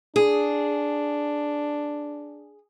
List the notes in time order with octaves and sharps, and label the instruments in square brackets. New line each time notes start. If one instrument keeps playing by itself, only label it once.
[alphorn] D4 [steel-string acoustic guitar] G#4